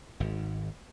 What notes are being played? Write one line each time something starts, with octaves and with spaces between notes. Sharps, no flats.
G#1 G#2